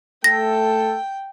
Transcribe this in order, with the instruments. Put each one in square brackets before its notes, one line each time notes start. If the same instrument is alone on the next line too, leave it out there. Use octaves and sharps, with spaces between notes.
[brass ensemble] A3 A4 [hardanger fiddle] G5 [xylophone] A#6